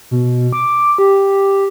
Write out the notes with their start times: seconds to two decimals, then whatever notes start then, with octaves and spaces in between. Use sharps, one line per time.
0.11 B2
0.53 D6
0.98 G4